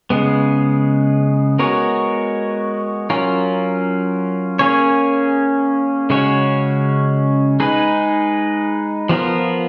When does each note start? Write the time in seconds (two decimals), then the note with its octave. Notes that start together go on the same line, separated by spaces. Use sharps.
0.10 C#3 G#3 B3
1.59 G#3 B3 F#4 A#4 C#5
3.10 F#3 C#4 F4 A#4
4.59 A#3 C#4 G#4 C#5
6.10 C#3 G#3 C#4 F#4 C#5
7.60 G#3 D#4 G#4 B4
9.09 F3 B3 F4 A#4